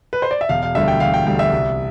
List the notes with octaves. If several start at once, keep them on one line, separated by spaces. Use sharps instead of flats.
B4
C5
D5
E5
E1 F5
F5
D2 D3 G3 E5
G5
E1 F5
G5
D2 D3 G3 G5
E5
C2